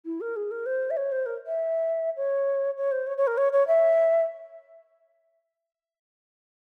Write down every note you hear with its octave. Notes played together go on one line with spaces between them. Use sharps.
E4
A#4
G#4
A#4
C5
E5
C#5
C5
A#4
E5
C#5
C#5
C5
C#5
C#5
A#4
C#5
C#5
E5